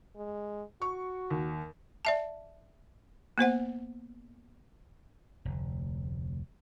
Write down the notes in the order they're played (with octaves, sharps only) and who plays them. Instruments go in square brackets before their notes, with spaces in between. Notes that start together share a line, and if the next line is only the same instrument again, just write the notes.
[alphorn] G#3
[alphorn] F#4 [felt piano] C#6
[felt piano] D#2
[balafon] D5 E5 A5
A#3 B3 C5 F#5
[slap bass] F1 D2